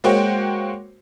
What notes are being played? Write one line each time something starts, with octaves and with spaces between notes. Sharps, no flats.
G#3 A#3 F#4 C5 C#5 G5